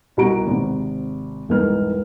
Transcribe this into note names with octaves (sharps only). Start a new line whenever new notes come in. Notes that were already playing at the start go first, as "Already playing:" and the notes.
C2 B2 F#4 A#5 D7
G#1 C3
E1 C2 G#2 B3 D#4 F6